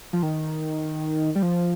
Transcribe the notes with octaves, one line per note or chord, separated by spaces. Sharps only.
F3
D#3
G3
F3